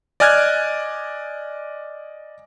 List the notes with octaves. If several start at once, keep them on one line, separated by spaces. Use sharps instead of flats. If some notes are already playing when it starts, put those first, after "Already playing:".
D5 D#5 G#5 F6 F#6 G#6